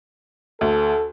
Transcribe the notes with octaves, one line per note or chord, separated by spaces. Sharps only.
D2 A4